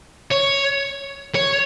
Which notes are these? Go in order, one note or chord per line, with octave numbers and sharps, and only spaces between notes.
C#5
C#5